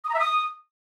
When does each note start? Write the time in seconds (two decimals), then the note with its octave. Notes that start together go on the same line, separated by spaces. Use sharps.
0.04 D#6
0.09 A#5
0.14 E5
0.19 D#6